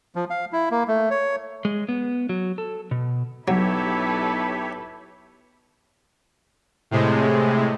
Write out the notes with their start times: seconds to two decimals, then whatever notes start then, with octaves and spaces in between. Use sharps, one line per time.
0.15 F3
0.30 F5
0.53 E4
0.71 A#3
0.88 A3
1.11 C#5
1.65 G#3
1.89 B3
2.29 F#3
2.58 A4
2.91 B2
3.48 B1 F#3 E4 G4 A4 B4 C#5 E5
6.91 A2 C3 G#3